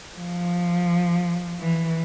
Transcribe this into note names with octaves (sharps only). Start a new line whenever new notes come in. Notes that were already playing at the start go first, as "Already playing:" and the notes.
F3
E3